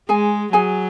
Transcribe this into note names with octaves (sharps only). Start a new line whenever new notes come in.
G#3 G#4 G#5
F#3 G#4 G#5